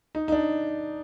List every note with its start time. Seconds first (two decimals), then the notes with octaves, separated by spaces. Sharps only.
0.15 D#4
0.28 D#4
0.32 D4